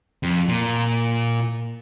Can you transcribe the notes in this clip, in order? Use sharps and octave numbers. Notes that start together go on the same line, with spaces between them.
F2
A#2